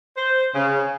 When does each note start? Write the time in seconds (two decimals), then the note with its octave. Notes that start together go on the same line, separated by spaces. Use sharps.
0.17 C5
0.53 C#3